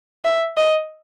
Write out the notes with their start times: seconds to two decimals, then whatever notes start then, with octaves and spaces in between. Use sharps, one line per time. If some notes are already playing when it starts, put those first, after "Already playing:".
0.25 E5
0.57 D#5